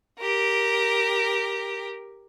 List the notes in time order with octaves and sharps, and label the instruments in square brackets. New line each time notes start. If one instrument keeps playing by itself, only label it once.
[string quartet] G4 A#4